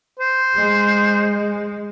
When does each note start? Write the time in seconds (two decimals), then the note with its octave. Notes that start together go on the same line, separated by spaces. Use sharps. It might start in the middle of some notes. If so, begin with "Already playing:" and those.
0.20 C5
0.55 G#3